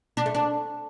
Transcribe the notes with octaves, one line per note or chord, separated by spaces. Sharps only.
D4
A3
D4